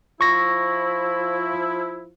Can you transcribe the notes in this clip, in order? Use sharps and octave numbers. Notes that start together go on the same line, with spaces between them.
F3 E4 C#6 A#6